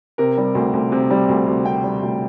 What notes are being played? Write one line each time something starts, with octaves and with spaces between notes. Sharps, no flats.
C3 A#4
G3
D2
D2
C3
G3
D2
D2
C3 G5
G3
D2